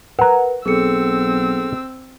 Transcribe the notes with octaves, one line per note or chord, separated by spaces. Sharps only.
A#4 B4 F#5 A#5
B1 C4 G#4 A4 E6 C#7